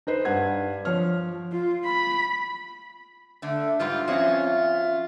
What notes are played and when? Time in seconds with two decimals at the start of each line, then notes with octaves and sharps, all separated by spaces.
0.07 D#4 B4 C5
0.25 G2 B4 F#5 G#6
0.85 F3 C#5 F6
1.52 F4
1.85 B5
3.42 D3 A3
3.79 G#2 G3 F4 B4
4.08 F3 C4 C#4 F4 F#4 C#5 D#5 E5